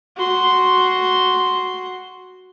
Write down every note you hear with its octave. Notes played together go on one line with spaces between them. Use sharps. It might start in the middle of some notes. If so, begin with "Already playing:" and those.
F#4 C6